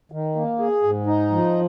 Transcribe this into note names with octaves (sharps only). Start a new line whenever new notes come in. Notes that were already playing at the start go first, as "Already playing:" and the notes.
D#3
A#3
G#4
G#2
D#4
F3